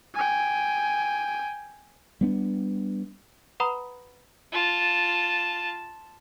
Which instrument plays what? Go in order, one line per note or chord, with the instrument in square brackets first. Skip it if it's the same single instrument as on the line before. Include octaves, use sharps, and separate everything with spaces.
[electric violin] G5 G#5
[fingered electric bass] G3 B3 D4
[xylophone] B4 F#5 A#5 B5 D#6
[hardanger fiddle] F4 A5